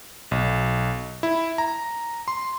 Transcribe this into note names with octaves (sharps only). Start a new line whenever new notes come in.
B1
E4
A#5
C6